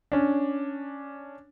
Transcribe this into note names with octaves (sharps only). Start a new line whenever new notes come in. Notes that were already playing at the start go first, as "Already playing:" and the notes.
C#4 D4